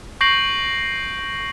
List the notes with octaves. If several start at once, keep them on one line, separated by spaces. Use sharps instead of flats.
C#6 G6 A#6 C7 D7 F#7